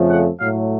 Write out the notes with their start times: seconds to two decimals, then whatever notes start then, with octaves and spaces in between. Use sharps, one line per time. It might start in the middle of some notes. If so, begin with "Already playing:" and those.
Already playing: F2 C#3 F3 A3
0.08 F#5
0.38 A2 F#3 A3 F5